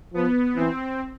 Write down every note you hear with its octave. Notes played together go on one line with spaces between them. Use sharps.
F3 B3
E3 C4